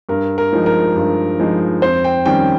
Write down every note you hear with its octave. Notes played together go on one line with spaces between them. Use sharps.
G2 A#4
A#4
F3 G#3 D#4
A#4
G2
F3 G#3 D#4
F2 C5
G5
D#3 G3 C#4 G5